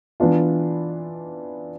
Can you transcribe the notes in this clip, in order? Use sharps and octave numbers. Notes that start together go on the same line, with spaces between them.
E3 B3 D4 F4